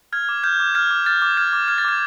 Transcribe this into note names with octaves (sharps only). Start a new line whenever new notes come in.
F6 G#6
D6
F6 G6
D6
F6 G#6
D6
F6 A6
D6
F6 G#6
D6
F6 G#6
A6
D6 G#6